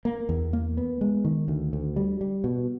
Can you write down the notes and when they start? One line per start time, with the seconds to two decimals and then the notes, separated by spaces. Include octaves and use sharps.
0.05 A#3
0.29 E2
0.53 A#3
0.77 B3
1.01 G#3
1.25 D#3
1.48 D2
1.73 D2
1.96 G3
2.21 G3
2.44 B2